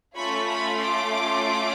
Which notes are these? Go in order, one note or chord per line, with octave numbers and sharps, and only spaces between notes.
A3 C#4 F4 B5 C#6
B5 C#6
C6 D6